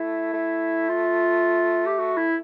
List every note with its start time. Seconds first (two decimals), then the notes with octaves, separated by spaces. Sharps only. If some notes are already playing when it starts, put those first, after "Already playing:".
Already playing: A3 E4
0.33 A3
0.89 F4
1.86 G4
1.99 F#4
2.17 E4